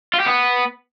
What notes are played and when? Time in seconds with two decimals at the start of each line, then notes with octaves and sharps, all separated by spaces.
0.14 F4
0.20 G4
0.26 B3